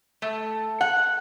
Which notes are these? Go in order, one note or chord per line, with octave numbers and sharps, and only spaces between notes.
A3
F#5